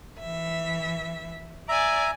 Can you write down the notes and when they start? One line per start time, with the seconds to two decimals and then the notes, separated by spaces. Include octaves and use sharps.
0.19 E3 E5
1.69 D5 E5 G#5 A#5